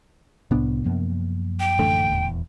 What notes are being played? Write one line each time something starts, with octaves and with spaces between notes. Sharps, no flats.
C2 A2 C3 B3 D4
F#2 F3 A#3
G5
A1 D3 A3
D#1 E2